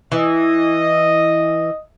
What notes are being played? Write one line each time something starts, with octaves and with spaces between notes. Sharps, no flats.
E3 D#5